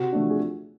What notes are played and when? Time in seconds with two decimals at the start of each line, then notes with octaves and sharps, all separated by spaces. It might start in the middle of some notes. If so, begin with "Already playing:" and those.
Already playing: C3 F#4
0.13 F3 A3 D4
0.30 G#4